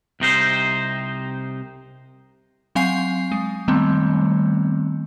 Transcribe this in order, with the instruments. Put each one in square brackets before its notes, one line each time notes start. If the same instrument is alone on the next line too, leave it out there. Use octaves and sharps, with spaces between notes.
[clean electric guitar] C2 C3 D#4 C5
[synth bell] F#3 C4 F5 G#5 G6 C7
G#3
D#3 G3 A3 B3 C4